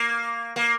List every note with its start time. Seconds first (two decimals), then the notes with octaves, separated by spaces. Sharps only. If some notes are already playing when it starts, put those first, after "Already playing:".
Already playing: A#3
0.56 A#3